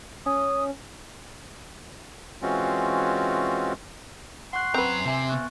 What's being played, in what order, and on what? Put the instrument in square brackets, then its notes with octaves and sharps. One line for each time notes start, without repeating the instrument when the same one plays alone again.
[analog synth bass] C#4 [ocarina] D#6
[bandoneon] E3 G#3 C4 C#4 F4 F#4
[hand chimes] F#5 C#6 F#6 [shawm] C6
[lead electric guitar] F#2 A#5 [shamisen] C4 B4
[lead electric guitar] C3 [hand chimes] E5 G#5
[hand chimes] B3 C#6 F#6